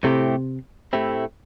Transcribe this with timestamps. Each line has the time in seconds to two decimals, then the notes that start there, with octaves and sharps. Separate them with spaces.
0.03 A2 C3 A3 C4 E4 G4
0.93 A2 A3 C4 E4 G4